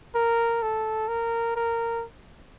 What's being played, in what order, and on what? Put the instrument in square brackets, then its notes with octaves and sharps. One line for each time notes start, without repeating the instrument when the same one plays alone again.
[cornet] A#4
A4
A#4
A#4